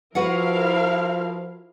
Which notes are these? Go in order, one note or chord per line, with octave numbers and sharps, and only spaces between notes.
F3 E4 F#4 A#4 B4 F5 F#5